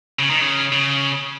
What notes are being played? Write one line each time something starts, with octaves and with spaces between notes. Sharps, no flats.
C#3
D#3
C#3
C#3